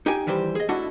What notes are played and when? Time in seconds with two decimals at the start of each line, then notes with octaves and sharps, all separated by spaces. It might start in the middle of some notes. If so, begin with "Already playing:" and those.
0.06 D#4 G4 G5 G#5
0.27 D#3 E3 G3 G4 C5
0.55 G#4 D#5
0.69 A3 D4 E4 F#4 D#5 F#5